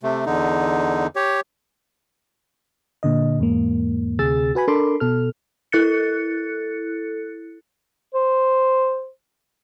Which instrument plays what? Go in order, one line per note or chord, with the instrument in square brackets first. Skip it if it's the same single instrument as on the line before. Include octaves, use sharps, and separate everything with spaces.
[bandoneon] C3 A3
E2 D3 D#4
G4 C#5
[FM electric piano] A#2 D3 D#5
E2 G#2 A#3
D2 C3 G#4 E6 A6
F#4 B4 G#5 B5
D4 A4 A#4 B5 C6 D6
B2 A4 F6
[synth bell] E4 A4 F#6 A6 C#7
[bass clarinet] C5